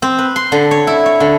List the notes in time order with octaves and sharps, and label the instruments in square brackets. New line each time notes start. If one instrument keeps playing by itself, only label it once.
[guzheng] C4
B4
C6
D3
C#5
E4
C#5
D3